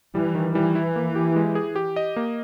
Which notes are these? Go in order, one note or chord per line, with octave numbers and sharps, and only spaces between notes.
E3 G3
D#3
E3 G3
E4
A#3
G4
G#3
G#4
G4
D#5
A#3